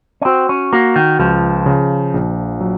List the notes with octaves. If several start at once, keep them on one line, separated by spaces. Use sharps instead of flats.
C#4
C4 F#4
C#4
A#3 F#4
D#3
C#2 F3
C#3
A#1
F#3